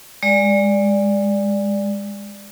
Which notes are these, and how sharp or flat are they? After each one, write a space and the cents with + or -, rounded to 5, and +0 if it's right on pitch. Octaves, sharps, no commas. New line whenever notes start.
G#3 -25 D5 +0